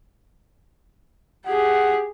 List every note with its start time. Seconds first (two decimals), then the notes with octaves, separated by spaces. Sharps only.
1.47 G4 G#4 F#5